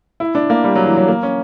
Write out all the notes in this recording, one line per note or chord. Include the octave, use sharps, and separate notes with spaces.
E4
D4
A#3
G3
F#3
E3
F#3
A#3
C#4